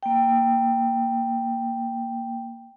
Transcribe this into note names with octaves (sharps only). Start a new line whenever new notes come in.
A#3 G5